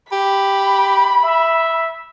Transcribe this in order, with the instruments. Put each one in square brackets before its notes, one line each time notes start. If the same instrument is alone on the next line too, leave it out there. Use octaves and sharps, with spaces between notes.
[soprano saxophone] G4 [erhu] B5
[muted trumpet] E5